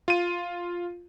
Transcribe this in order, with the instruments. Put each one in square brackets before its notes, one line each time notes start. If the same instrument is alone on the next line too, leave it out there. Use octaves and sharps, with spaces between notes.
[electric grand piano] F4 D#7